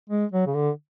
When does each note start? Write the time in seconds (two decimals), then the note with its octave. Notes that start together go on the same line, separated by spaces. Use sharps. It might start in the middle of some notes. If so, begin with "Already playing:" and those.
0.09 G#3
0.32 F#3
0.46 C#3
0.54 D3